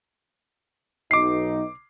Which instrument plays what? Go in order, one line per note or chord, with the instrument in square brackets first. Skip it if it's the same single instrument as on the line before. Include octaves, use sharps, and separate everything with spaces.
[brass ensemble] B1 D#4 [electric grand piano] D6 C7